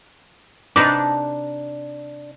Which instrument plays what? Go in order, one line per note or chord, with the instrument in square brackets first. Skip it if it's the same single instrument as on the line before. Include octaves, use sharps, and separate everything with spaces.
[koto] C3 D#4 B4 [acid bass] D4 [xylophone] D6